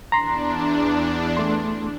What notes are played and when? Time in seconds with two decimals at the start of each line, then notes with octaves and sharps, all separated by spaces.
0.12 E2 D4 A#5 C6
1.37 A3 C6